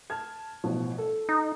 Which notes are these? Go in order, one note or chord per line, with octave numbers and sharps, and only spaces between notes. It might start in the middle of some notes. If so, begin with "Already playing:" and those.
A5 F6 G#6
A1 B2 F3
A4
D#4